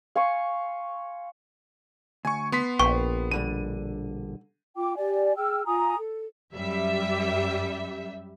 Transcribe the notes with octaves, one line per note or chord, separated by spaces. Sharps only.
F5 G#5 C6 C#6
D2 G#5 C#6
B3 C6 B6
A#1 B4 G5 C#6
B2 D3 G3 D#7
F4 G5 D6
G4 D5 G#5
G#4 G5 E6 F6
F4 G#5 A#5 D#6
A4
F#2 G3 E5